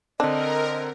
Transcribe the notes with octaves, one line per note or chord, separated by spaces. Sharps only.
D3 C4 D4 A#4 D#5